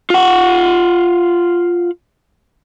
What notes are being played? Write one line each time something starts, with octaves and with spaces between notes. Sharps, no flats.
F4 F#5